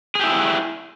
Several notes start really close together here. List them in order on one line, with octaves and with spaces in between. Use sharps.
G#4 G4 E4